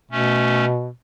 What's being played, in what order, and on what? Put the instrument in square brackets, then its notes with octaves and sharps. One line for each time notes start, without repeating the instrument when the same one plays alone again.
[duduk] B2 [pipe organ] A3 C#4